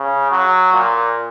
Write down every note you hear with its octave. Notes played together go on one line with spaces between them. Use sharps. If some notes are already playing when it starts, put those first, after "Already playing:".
Already playing: C#3
F#3
A#2